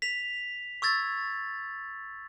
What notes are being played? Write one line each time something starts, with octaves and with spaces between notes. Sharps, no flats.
B6 F7
C#6 E6 G#6 A6